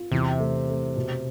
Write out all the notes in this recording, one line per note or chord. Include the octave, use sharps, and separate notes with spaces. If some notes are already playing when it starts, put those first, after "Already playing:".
Already playing: F4
E2 C3
A3
A3
B2